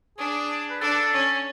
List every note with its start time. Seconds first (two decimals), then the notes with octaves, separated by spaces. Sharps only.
0.18 D4 G#4
0.70 B4
0.81 D4 A4
1.13 C#4